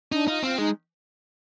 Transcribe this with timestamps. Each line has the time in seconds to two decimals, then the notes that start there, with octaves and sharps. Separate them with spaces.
0.12 D4 D#4
0.28 D#4 F4
0.42 C4 F4
0.58 G#3 D#4